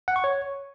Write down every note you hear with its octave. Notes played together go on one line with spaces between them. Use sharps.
F#5
C#6
C#5